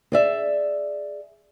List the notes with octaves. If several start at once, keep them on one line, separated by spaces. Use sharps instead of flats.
G#4 D5 E5